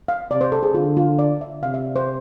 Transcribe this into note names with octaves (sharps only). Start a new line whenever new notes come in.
F5
C3 D5
C5
A4
G#4
D3 F4
F4
D5
E5
C3 F5
E5
D5
C5